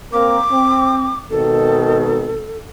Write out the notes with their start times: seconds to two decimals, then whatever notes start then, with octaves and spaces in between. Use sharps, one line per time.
0.13 A#3 C4 A#4 D6
0.51 C4
1.30 G#1 B2 D#3 A4